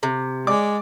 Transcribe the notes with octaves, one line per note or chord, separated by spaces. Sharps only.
C3
G#3 D5 D6